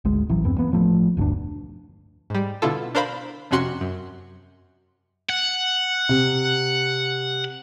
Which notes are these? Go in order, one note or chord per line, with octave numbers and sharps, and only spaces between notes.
G#1 D2 G#3
A1 E3 F#3
E2 G2 B3 C4
E3 A#3 B3
A1 F3 F#3 A3
E1 D2 G2 D4
G#2 G3
B2 D3 E4 F4 A4
D4 A#4 C5 F5 B5
F2 C3 C#4 F#4 C6 C#7
F#2
F#5
C3